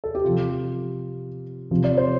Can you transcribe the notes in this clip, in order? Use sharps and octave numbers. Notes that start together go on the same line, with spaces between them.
A4
G4
C3 F3 F4
C3 F3
D5
C5